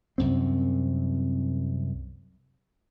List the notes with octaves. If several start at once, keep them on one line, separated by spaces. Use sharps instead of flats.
C2 F#2 C4